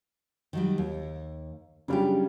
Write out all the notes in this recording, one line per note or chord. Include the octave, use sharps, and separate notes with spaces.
D#3 F#3 G3
D#2
C#3 F#3 G3 D4 F4 G4